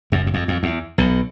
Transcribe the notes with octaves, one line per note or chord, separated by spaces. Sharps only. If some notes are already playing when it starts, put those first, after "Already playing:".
F#1 F#2
F#2
F2
F2
E2
B1 B2